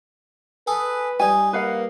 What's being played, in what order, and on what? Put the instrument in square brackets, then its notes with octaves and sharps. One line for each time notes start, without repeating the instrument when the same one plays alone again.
[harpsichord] G#4 A4 G#5 [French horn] B4
[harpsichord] G3 D#4 [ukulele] G#5
[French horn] A#3 [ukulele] B4 F5 F#5